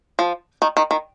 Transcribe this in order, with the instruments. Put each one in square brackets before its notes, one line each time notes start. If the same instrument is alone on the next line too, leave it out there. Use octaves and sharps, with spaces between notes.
[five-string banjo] F3
D#3
D#3
D#3